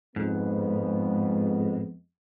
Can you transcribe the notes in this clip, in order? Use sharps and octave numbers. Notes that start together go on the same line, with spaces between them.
F2 G#2 G#3 B3